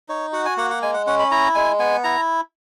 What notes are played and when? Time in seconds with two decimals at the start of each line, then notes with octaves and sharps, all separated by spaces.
0.09 D#4 C#5
0.33 F#4 F#5
0.45 G#5
0.57 A#3 F#5
0.70 F#5
0.82 G#3 G#5
0.94 F#5
1.07 C#4 F#5
1.19 B5
1.31 E4 A#5
1.55 G#3 G#5
1.80 B3 G#5
2.04 E4 A#5